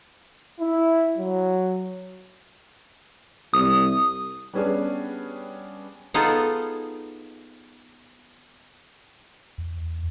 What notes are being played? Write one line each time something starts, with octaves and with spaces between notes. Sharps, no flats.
E4
F#3
C2 D#6
G3 B3 C#4 D4 G#4
B3 D#4 F4 G#4 A4
E2